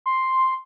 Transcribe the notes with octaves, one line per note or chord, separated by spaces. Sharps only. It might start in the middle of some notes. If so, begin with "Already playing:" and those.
C6